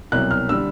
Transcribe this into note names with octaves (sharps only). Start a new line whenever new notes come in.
C2 B2 F#3 F#6
F6
D3 G3 E6